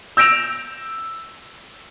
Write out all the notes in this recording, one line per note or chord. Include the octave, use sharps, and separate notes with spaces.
E6 G6 A#6 D7 E7 F7